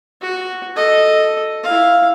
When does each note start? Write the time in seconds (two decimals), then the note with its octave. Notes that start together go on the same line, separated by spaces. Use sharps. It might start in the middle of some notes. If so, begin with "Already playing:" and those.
0.22 F#4
0.76 A4 D#5
1.63 E4 F5